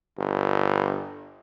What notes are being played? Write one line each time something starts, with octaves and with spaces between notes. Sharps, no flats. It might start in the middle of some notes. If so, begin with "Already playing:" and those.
G1